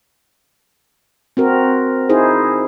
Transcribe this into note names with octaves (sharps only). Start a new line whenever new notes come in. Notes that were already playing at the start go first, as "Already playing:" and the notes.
C4 F#4 A#4
D#4 E4 G#4 C5